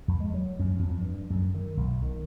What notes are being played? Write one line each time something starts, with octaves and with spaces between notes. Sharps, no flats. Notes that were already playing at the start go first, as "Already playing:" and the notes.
F2
G#3
F#3
F#2
F2
G2
F#2
D#3
B1
D#3